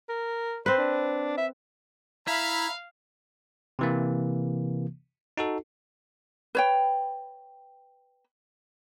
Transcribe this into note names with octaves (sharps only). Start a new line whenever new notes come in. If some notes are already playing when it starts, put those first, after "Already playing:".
A#4
C4 B4 C5
D4
E5
E4 E5 F5 A#5 B5
C3 E3 A#3
D#4 F#4 A4
B4 C#5 G5